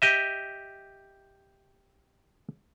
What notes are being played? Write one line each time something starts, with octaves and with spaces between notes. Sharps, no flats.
G4 D#5 E5